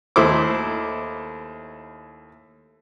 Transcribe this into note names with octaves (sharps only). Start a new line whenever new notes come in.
D#2 A3 E4 C5 D6